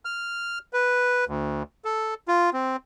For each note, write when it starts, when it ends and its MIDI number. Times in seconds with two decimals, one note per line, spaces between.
0.05 0.59 89
0.73 1.25 71
1.28 1.63 38
1.85 2.14 69
2.28 2.50 65
2.53 2.76 60